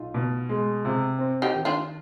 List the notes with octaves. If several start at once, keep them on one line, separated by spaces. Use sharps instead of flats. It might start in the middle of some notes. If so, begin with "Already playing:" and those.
Already playing: B1 D#4 F4
B2
G#3
C3
C4
D#4 G4
D#3
D4 F4